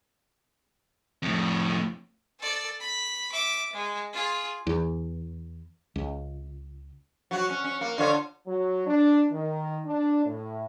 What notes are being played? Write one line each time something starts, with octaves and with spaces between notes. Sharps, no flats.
F2 A2
A4 D5
B5
E5 D6
G#3
F4 G#4
E2
C#2
F#3 F#4
C#4
C#4
A#3
D3 F4 C#5
F#3
D4
D#3
D4
A2